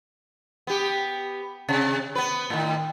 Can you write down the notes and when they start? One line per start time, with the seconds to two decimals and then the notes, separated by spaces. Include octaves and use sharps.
0.67 B3 G4
1.69 C3
2.15 B3 B4
2.50 A2 D#3